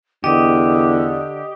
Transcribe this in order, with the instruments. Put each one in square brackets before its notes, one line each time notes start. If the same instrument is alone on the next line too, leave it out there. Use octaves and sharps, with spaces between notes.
[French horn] E2 [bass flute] D3 [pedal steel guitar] G4 [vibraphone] D#5 D#6